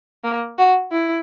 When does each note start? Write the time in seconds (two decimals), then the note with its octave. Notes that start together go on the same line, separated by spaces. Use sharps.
0.24 A#3
0.58 F#4
0.92 E4